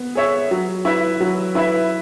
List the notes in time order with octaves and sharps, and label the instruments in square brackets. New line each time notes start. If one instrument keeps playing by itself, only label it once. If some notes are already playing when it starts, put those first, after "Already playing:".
Already playing: [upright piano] B3
G#4 C#5 E5
F#3
E4 B4 E5
F#3
E4 B4 E5